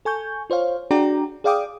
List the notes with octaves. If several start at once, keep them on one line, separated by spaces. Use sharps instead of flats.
A4 G#5 C#6 G6
F4 C5 C#5 F5
D4 F#4 G#4 D5 G5 A#5
G#4 D5 F5 G5 D6 D#6